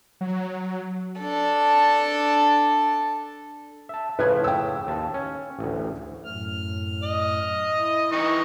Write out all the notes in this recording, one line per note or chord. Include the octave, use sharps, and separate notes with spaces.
F#3
D4 A4
E5 A5
A2 C#3 F3 B4 G#6
G5 E6
D#2 A5
C#4
A1 D2
F#2 A2 F6
D#5
E4
E3 D#4 C#6